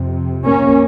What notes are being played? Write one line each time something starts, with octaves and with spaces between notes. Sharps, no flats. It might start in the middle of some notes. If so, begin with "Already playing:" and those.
Already playing: F2 C3
A#3 C#4